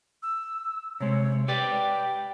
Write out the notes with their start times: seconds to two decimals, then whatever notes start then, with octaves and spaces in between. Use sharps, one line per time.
0.23 E6
1.00 C3 G#3 C#5
1.48 G4 B4 D5 G5